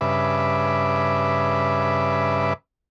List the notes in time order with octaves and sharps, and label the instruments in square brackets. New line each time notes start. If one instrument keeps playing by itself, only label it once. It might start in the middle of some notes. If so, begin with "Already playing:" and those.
[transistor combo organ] G2 C#3 B4 E5 D6